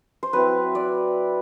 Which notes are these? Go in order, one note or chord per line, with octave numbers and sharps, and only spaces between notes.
C5
F#3 C4 E4 B4
D5